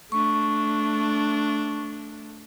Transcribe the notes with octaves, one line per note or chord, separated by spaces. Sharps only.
A3 D4 C#6